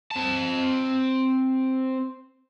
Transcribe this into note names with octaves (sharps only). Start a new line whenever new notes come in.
C4 A5